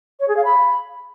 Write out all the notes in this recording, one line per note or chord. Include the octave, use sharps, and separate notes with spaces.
C#5
G#4
F5
B5